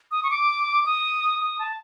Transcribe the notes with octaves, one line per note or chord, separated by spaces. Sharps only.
D#6
C#6
D6
D#6
D#6
A5